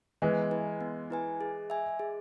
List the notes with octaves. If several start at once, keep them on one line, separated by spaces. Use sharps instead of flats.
E3 G#3 B3
E4 B4 G#5
B3
E4 B4 G#5
G#4
E5 G#5
G#4